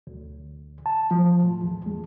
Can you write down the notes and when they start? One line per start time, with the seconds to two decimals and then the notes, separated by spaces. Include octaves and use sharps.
0.07 D2
0.86 A5
1.11 F3
1.43 A2
1.64 E2
1.86 G#3